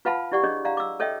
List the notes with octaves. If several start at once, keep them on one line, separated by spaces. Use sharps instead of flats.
F4 B4 F5 F#5 A5 B5
E4 G4 D5 F#5 C#6
D4 G#4 C#5 D#5
D5 F5 F#5 A#5
D6 E6
A4 C#5 D#5 E5 G5